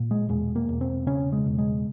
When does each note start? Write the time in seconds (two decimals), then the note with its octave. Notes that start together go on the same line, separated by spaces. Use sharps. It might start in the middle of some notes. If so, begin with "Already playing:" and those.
Already playing: A#2
0.11 G#3
0.29 E1 G#3
0.56 A#3
0.69 E1
0.81 C4
1.07 C#3 C#4
1.32 G#3
1.46 E1
1.58 G#3